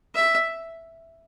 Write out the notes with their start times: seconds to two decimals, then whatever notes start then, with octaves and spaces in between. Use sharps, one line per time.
0.15 E5